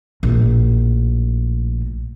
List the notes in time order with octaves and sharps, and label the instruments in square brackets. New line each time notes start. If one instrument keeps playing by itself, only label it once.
[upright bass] A#1 A2